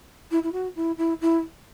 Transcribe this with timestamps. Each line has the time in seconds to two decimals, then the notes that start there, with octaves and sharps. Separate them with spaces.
0.31 E4
0.43 E4
0.52 F#4
0.76 E4
0.98 E4
1.21 E4